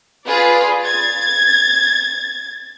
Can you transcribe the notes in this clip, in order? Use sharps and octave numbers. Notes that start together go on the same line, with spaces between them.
F4 G#4 B4 D5
G#6 A6